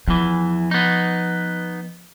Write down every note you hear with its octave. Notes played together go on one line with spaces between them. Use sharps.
E2 E3 F3
B3 D#4